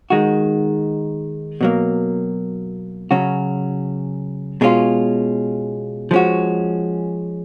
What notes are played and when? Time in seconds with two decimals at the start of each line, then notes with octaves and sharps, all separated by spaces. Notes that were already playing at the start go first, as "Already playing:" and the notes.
0.10 D#3 G#3 D#4 F#4
1.61 B2 F#3 A#3
3.11 C#3 F#3 C#4 F#4
4.61 B2 G#3 C#4 F4
6.11 F3 G#3 C#4 F#4